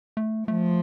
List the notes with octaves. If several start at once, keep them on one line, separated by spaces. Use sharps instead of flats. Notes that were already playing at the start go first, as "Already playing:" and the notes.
A3
F3 A3